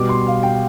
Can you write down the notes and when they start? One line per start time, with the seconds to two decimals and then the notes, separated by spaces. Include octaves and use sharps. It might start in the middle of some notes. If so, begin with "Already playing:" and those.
Already playing: B2 G3 B3 D6
0.09 C6
0.27 F5
0.43 G5